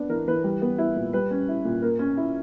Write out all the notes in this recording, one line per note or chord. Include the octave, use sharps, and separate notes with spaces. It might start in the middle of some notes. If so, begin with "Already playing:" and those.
Already playing: B3 D4
E3 A#4
E3 B4
G3
B3
E4
A#2
G3 B4
C#4
E4
A#2
A#3 A#4
C#4
E4